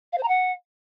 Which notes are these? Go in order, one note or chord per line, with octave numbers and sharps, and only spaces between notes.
F5
C5
A#5
F#5